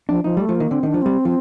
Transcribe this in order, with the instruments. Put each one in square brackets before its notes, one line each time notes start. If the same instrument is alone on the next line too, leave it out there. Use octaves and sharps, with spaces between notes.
[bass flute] F3 [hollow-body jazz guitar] D4
[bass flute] F3 [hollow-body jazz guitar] D#4
[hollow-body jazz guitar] G3 [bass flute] A3
[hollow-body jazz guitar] F3
[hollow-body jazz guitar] D#3 [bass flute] A#3
[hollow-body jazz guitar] D3 [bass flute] C4
[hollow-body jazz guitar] D#3 [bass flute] D4
[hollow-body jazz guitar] F3
[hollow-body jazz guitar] G3 [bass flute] C4
[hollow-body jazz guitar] F3